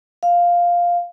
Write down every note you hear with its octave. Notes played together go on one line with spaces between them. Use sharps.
F5